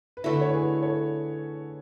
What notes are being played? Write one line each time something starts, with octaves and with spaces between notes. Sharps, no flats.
B4
D3 A3 E4 F#4 A4
C#5
G#4 B4
A4 C#5